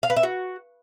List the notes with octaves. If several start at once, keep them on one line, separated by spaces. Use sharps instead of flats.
F5
B4
E5
F#4